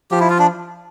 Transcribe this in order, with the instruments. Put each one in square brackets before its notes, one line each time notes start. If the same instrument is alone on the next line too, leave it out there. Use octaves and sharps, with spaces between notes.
[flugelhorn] F3 [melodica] G4
[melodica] E4
F4
D4